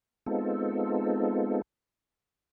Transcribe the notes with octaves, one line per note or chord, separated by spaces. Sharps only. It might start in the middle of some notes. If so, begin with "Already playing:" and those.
G#3 B3 C4 D#4 F4 A4